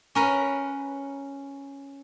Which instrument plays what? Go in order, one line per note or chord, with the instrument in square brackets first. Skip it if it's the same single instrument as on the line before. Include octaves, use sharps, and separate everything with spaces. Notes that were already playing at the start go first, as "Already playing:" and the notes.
[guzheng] C#4 A#4 B4